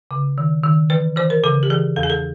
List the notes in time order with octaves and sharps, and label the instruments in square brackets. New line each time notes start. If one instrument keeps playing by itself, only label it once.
[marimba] C#3
D#3
D#3
E3 B4
E3 C5
A#4
C#3 A4
G4
E3 G#4
E2 A4
G#4
A4